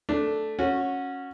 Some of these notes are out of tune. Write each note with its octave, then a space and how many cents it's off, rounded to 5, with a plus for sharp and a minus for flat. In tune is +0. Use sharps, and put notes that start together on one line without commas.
A3 +0 D4 +0
C#4 -5 F#4 -20